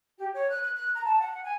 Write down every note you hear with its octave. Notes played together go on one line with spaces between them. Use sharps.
G4
C#5
F#6
F#6
F#6
A#5
A5
F#5
G#5